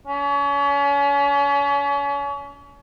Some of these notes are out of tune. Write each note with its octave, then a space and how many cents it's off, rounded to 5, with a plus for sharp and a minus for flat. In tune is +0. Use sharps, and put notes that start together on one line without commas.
C#4 +35